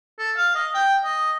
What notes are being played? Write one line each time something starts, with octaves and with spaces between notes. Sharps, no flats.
A4
F5
D#5
G5
D#5